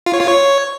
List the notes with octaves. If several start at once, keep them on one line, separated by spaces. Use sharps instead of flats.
F4
C#5
F4
C#5